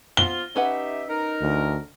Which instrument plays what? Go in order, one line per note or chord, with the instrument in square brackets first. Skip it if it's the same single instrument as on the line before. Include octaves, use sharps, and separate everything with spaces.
[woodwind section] F3 B3 F4 [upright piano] G7
[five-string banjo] C#4 B4 F#5 [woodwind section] D#4 G4 E5
[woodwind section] D#4 A#4
[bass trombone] D2